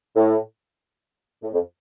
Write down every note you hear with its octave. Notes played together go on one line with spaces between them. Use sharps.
A2
A2
F2